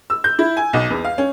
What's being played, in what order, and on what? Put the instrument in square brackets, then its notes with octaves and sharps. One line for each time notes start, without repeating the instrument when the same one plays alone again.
[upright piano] E6
G6
E4
G#5
B1
E2
F5
C#4